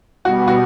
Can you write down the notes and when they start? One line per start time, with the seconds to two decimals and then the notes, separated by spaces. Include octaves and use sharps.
0.24 B2 G3 B3 F#4
0.48 F#4